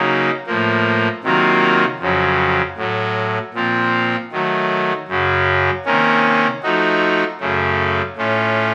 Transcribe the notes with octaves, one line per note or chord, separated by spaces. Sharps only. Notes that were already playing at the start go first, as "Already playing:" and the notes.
Already playing: C#3 F#3 A#3 D#4
A2 F3 A#3
C3 D#3 F#3 A#3 F4
F2 C#3 F#3
A2 F#3 A3
A#2 F3 C4 F4
D#3 F#3 A3
F#2 C#3 F#3
C3 D#3 A#3 C#4
F3 A3 D#4 F#4
F#2 C#3 A3
A2 A3 C#4 F4